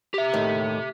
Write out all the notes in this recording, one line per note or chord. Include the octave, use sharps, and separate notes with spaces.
G4 E5
D#2 A2 D#3